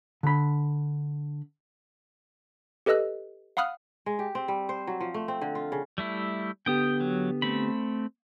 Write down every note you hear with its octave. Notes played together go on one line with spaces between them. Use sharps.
D3 B5
G4 A4 B4 D#5 E6 F#6
F5 F#5 B5 D#6 F6 F#6
G#3
G4
C4
G3
C5
F#3
F3
A3
C4
D3
F4
C#3
G3 A3 E4
D3 B3 G4 G5 D#6
F#3
A3 C4 B5